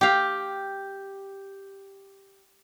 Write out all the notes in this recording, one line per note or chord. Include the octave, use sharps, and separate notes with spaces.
G4 F5